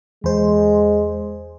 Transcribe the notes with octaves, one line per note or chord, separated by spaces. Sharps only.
E2 G#3 C5